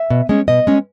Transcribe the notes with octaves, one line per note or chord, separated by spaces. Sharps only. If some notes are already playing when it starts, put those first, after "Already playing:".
Already playing: E5
B2
G#3 C#4
B2 D#5
G#3 C#4